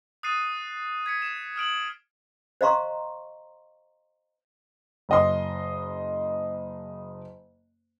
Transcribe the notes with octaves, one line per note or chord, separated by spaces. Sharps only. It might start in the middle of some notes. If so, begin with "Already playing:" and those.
D#6 F#6 A6 C7 D#7
G#6 B6 C#7
E7
D#6 F6 D7 F#7
C5 D#5 F5 A#5 C6 C#6
F#1 D#5 C6